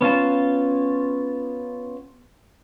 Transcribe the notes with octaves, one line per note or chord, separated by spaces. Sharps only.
B3 C#4 F4 A5